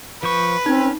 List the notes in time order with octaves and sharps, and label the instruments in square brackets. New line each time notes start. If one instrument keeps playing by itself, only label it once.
[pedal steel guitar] F3 C5 C#6 [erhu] B4
[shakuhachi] C4 [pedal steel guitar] C#4 [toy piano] D#4